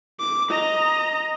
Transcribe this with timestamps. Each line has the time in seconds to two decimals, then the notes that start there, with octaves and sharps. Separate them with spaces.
0.19 D6
0.50 D#5 A#5